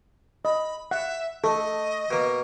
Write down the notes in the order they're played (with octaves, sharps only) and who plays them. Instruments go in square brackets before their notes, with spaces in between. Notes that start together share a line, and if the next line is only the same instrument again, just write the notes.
[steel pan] D#5 [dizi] B5
[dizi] E5 [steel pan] F#5
[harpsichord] A3 [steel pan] A4 [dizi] D#5
[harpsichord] B2 A#3